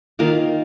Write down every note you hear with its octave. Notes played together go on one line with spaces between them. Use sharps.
D#3 A#3 F4 A#4